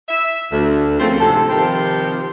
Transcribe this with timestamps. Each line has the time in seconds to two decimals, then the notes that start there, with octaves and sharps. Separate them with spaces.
0.08 E5
0.52 D2
0.99 C#3 F3 A3 A#3 C4
1.20 F2 G#2 C3 A4
1.49 C3 D#3 F3 G3 C4 C5